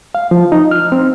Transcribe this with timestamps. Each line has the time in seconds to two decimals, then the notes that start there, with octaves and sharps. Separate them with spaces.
0.15 F5
0.31 F3
0.52 D#4
0.71 F6
0.92 C4